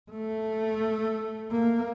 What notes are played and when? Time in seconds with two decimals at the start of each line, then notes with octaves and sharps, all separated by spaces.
0.11 A3
1.51 A#3